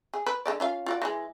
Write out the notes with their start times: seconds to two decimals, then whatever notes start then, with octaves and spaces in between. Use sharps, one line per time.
0.14 G#4
0.26 B4
0.46 D3 G#3 D5
0.60 C#4 F4 F5
0.86 F4 F#4 D5
1.02 E3 G#3